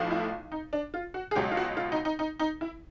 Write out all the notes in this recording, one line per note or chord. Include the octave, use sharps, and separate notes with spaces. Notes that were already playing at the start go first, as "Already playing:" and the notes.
Already playing: B1 A2 F3
E4
D#4
D4
F4
F#4
G#4
C#2 B2 F#3 G4
F4
F#4
F4
D#4
D#4
D#4
D#4
E4